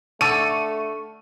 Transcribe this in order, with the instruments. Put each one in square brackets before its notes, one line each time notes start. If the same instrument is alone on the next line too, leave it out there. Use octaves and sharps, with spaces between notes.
[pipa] D3 A4 [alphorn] A3 [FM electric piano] C#6 [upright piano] D#7